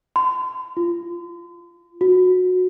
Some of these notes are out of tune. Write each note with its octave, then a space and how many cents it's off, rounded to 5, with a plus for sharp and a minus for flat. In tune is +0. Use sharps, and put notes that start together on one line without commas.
C6 -40
F4 -15
F#4 -15